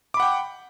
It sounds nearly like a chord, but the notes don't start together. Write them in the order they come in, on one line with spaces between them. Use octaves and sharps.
D6 B5 F#5 G5